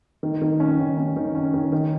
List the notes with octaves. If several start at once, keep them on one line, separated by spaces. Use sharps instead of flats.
D#3
D#3
C#4
D#3
C#4
D#3
C#4
D#3
D#3